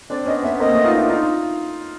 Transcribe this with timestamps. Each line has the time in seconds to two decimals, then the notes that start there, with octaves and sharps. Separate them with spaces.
0.10 C4 D4 D5
0.26 B3 C#4 D#5
0.43 B3 C#4 E5
0.60 A#3 C4 D#5
0.72 A3 B3
0.85 D#4 F4
0.97 D4 E4
1.10 D#4 F4